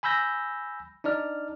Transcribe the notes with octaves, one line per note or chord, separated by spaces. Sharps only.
G#5 B5 E6 G6 A#6
D4 D#4 D5 F6